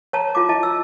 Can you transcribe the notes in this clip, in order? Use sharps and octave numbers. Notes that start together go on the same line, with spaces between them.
C#5 A5 A#5
E4 F4 A#5 D6
E4 D#5 A5
E6